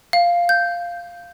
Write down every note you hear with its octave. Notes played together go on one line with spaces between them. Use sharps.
F5
G6